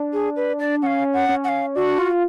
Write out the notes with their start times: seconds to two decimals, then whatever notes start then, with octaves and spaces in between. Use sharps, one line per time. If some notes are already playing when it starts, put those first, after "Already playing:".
Already playing: D4
0.13 G#4
0.36 B4
0.59 D5
0.82 C#4 F5 F#5
1.13 F#5
1.29 C#4
1.44 F#5
1.48 F5
1.75 D4 F#4
1.98 F4